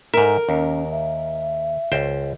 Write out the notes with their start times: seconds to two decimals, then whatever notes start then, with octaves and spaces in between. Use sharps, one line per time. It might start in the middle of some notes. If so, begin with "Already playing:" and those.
0.14 G#2 A#4 E5
0.49 D#2 C#4
0.91 E5
1.92 C#2 C5 G5